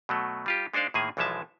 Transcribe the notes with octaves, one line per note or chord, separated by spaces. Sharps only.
B2 F#3 A3
G3 F4 G4
G#3 D4 D#4 C5 D5 F5
A2 D#3 A#3 G#4 G#5
B1 E3 F3 G#3 E5 A5